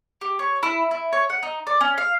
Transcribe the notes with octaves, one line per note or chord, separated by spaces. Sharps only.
G4
C#5
E4
E4
C#5
F#5
D#4
D5
C#4
F5